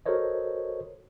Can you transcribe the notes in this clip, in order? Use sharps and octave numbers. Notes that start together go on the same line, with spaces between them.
F#4 A4 A#4 C5 C#5 D#5